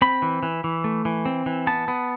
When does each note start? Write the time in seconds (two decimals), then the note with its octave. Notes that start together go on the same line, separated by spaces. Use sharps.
0.02 C4 B5
0.22 E3
0.43 E3
0.64 E3
0.84 A3
1.05 E3
1.25 C4
1.46 E3
1.67 B3 A5
1.88 B3